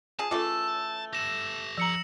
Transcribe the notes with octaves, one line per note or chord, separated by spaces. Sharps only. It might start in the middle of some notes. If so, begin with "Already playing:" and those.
F3 G#4 A5
C#3 E3 A3 F4 D6
G4 A4 A#6 E7
F3 A#5 E6 C#7 F#7